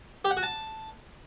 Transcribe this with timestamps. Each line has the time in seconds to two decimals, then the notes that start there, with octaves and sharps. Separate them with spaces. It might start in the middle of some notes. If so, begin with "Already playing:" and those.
0.25 G4
0.31 F#5
0.37 F#4
0.43 A5